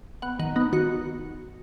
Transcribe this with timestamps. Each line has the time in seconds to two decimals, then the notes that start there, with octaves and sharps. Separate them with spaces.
0.22 B3 F#5
0.39 D#3 F#5
0.56 B3 D#4
0.73 D#3 F#4